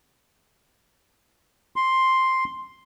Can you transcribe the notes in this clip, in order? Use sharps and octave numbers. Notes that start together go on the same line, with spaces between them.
C6